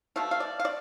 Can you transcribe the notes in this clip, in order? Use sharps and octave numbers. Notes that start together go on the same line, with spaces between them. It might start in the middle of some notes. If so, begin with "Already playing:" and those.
B2 A3 F5
F5
D5
F5
D5